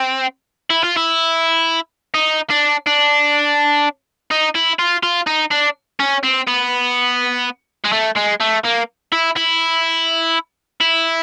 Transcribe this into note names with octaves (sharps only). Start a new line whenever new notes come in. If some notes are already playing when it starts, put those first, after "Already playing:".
Already playing: C4
E4
F4
E4
D#4
D4
D4
D#4
E4
F4
F4
D#4
D4
C#4
C4
B3
G#3
A3
G#3
A3
A#3
E4
E4
E4